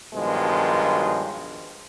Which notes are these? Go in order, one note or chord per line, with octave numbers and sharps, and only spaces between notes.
G2 B2 D#3 F3 F#3 G#3